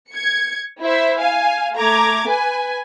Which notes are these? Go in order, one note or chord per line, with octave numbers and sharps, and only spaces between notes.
G#6 C#7
E4 C5 E5
F5 G#5
A3 A#5 D6 G#6
B4 G#5